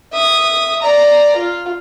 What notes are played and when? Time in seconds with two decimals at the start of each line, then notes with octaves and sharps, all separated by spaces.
0.13 E5 D#6
0.82 D5 A#5
1.36 F4